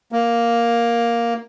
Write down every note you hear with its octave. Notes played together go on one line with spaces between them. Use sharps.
A#3